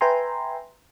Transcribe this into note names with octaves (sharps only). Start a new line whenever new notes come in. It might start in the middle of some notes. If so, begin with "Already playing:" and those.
B4 E5 G5 G#5 A#5 C6